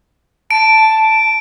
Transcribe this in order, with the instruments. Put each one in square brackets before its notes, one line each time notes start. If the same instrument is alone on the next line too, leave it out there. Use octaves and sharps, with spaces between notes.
[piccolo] A5 [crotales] D7